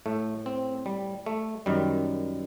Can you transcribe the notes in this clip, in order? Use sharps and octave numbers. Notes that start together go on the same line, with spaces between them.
A2 A3
C4
G3
A3
F#2 D#3 G3